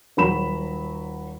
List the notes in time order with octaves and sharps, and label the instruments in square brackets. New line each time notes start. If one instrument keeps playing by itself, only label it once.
[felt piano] D#1 F#3 B5 E7